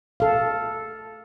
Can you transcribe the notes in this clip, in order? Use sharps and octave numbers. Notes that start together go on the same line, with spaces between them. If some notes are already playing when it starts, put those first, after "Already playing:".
A4 F5